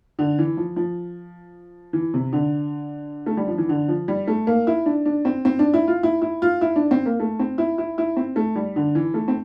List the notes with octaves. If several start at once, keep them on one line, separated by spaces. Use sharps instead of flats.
D3
E3
F3
F3
E3
C3
D3
A3
G3
F3
E3
D3
F3
G3
A3
A#3
E4
D4
D4
C4
C4
D4
E4
F4
E4
E4
F4
E4
D4
C4
A#3
A3
C4
E4
E4
E4
C4
A3
G3
D3
E3
A3
C4